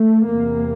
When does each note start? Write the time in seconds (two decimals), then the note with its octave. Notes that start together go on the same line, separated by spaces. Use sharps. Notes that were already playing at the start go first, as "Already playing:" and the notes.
Already playing: A3
0.24 E2 C3 A#3